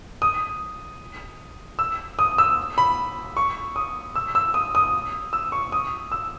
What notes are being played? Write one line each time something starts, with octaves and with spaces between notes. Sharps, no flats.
D#6
E6
D#6
E6
B5
C#6
D#6
E6
E6
D#6
D#6
E6
C#6
D#6
E6